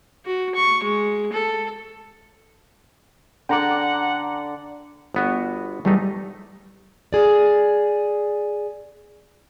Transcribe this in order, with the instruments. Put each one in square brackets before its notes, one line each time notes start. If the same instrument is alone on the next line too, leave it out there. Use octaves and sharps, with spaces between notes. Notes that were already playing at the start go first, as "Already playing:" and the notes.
[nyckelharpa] F#4
C#6
G#3
A4
[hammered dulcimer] D3 D5 [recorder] F#5 [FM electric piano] G5 A#5 D6
[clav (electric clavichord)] G1 B3 F#4
[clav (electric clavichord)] E2 A3 D#4 [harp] G3
[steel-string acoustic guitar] G#4 D5